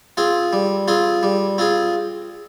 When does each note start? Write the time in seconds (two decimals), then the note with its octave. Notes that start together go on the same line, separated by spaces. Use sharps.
0.17 C4 F4 G#4
0.53 G3
0.88 C4 F4 G#4
1.23 G3
1.58 C4 F4 G#4